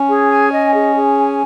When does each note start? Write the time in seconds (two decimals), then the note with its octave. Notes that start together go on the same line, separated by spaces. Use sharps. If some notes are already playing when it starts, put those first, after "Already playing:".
Already playing: C#4
0.08 G#4
0.29 G#5
0.51 D#5
0.73 G#4
0.96 G#4
1.17 G#5